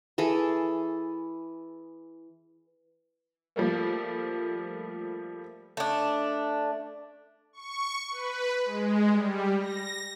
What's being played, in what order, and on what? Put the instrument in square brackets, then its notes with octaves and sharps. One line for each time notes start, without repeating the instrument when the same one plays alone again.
[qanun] E3 G#4 A4
[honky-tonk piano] F3 G3 A3 A#3
[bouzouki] A3 D4
[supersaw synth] C#6
B4
G#3
G3
A#6